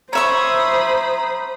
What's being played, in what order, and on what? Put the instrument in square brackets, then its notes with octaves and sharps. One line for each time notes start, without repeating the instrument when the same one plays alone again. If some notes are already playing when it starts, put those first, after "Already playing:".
[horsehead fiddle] C5 [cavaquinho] C#5 E5 C#6 [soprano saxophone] A#5 [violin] B5 D#6